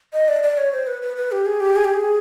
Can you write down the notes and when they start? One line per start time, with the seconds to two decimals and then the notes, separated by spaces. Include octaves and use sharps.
0.13 D#5
0.28 D5
0.43 D5
0.57 C#5
0.73 C5
0.87 B4
1.02 B4
1.16 B4
1.32 G4
1.46 G#4
1.60 G4
1.76 G#4
1.85 G4
1.94 G#4